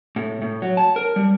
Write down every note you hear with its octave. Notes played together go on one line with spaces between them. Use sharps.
A2
A2
F#3
A5
A#4
G3